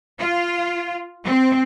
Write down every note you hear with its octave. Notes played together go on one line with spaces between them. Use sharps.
F4
C4